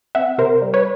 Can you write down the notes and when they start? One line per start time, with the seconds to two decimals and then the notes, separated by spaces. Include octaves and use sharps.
0.15 C4 E5 F#5
0.38 C3 A#4 C5
0.62 G3
0.74 B4 C#5